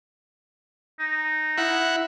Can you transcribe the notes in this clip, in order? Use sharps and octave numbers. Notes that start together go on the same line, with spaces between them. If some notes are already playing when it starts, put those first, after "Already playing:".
D#4
E4 F#5